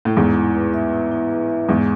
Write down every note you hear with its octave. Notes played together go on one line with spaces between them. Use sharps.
A2
E2 G#2 E4
E4
B4
E5
E4
E4
B4
E5
E2 G#2 G#3